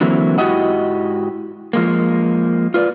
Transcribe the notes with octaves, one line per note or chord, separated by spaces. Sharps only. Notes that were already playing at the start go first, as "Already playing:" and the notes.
D3 E3 F#3 A#3 C4 E4
G#2 E4 F#4 G4 D#5 F#5
F3 G#3 A#3
F4 B4 C#5 D5